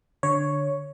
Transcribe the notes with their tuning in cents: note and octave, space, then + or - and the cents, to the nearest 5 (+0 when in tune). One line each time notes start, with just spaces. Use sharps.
D3 +0 C#5 +0